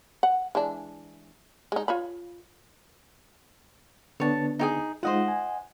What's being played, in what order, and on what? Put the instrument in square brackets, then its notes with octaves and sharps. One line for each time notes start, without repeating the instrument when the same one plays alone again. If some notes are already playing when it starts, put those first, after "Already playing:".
[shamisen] F#5
E3 G#3 D4
G#3 D#4
F4 C#5 B5
[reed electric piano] D3 B3 D4 [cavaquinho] C#5 A5
[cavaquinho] D#4 G4 G#4
[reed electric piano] G#3 D#4 F4 [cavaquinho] C5 D#5 F#5
[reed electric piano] G#5